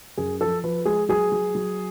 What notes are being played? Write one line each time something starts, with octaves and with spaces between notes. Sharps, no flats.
F#2 G#4
F3 A4
F3 B4
G#3 G#4
F#3 G#4
F#3
F#3